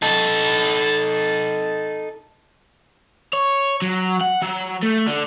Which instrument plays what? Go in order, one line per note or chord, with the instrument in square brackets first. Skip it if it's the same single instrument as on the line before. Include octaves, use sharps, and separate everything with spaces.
[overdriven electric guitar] D#4 A4
C#5
F#3
F#5
F#3
A3
D3